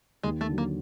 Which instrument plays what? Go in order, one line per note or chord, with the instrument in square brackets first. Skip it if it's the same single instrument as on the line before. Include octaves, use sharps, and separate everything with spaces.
[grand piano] D#2 [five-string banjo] G#3
[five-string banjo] A3
[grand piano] D3 F#3
[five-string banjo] A#3